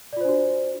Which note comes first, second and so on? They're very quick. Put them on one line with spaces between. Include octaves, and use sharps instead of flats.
D5 F4 C5 D4 F#4